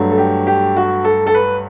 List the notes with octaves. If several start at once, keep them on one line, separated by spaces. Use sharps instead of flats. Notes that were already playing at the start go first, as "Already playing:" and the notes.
Already playing: G2 F#3 A3
A4
G4
G4
F#4
A4
A4
B4